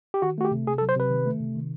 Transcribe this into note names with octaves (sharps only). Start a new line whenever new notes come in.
G4
D#3 F#4
A3 F#4
G4
C3
C3 G#4
A4
F#3
C5
C3 B4
D#3
A3
C3
D#3